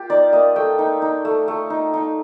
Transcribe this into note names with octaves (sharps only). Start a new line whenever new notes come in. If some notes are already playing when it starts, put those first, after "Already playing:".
Already playing: A#3 F4 G4
D#4 D5
A#3 D#5
A3 G5
D#4
D#4
A3
A3
D#4
D#4